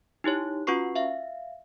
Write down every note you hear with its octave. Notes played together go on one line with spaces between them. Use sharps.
D#4 E4 G4 C#5
C#4 F4 F#4 B4 C#6 C7
E5 F5